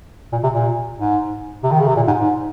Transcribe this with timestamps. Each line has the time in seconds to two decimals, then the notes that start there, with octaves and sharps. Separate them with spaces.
0.32 A#2
0.43 C3
0.54 A#2
0.98 G#2
1.63 C3
1.72 D#3
1.80 C#3
1.88 C3
1.96 A#2
2.07 G#2
2.19 G#2